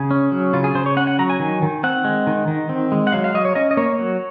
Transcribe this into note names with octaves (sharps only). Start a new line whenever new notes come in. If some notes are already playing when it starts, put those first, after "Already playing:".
Already playing: C#3 G#4
C#4
F#3
C#3 F4
G#4
C#3 C5
C#5
C#4 F#5
F#5
F#3 A#5
G#5
D#3
D#3
C4 F#5
G#3
D#3
D#3
C4
G#3
F#5
F#3 F5
F5
F#3 D#5
C#5
C#4 D#5
D#5
A#3 C#5
F#3